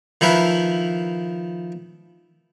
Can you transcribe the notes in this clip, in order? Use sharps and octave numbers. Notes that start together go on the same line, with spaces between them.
D#3 F3 E4 A#4 B4